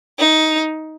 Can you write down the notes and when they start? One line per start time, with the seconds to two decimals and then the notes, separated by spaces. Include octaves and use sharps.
0.19 D#4